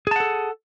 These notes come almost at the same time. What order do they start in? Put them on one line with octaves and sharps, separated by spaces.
G#4 A5 F#5 A4